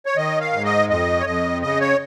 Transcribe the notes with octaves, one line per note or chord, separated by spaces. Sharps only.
C#5
D#3 D#5
F5
G#2
D#5
F2 D#5
C#5
F2 D#5
C#3 D#5
C#5